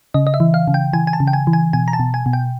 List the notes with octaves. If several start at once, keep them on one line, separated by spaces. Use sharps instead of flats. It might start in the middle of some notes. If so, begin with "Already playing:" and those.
C#3 D#5
D#5
E5
E3
F5
C#3
G5
E3 G#5
G#5
A5
C#3
G5
G#5
E3
G#5
B2 G#5
A#5
A5
B2
G#5
B2
G5